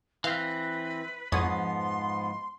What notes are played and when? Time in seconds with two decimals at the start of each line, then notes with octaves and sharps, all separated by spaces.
0.24 E3 C4 B4 F5
1.32 F2 G#2 F3 B3 C#5 C6 D#6